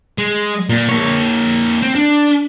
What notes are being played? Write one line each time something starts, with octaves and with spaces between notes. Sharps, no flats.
G#3
A#2
A#3 C#5
C4
D4